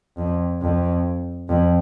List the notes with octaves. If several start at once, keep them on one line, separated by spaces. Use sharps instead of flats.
F2
F2
F2